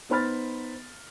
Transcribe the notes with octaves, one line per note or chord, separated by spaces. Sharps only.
B3 D#4 C5 B5 F6 A6